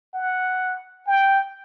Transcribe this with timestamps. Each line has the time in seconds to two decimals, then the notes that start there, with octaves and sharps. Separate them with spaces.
0.14 F#5
1.07 G5